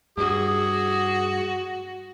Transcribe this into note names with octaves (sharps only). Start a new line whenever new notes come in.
G2 F#4 G#4